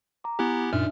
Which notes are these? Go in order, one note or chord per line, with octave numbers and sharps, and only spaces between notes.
A#5 D6
B3 E4 G4 G#5 F#6
F#2 A#2 D4 D#4 E5 F6